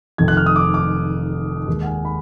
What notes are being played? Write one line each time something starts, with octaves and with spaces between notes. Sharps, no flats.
F1 F2 D#3 G#6
F#6
F6
D#6
D6
D6
D#2 D#3 G#3
F#5
G#5
B5